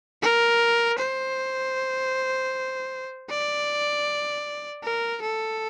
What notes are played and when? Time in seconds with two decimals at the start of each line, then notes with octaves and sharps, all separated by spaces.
0.22 A#4
0.98 C5
3.30 D5
4.83 A#4
5.23 A4